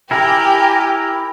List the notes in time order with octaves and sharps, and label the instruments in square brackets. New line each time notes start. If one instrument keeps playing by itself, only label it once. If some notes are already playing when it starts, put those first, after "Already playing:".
[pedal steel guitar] E4 A#4 [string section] G4 [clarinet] G#5